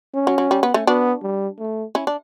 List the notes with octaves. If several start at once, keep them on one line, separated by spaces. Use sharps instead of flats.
C#4
F#3
F#3
G3
B3
A3 C#4
B3 D4 F#4
G3
A3
C#4 E4
D4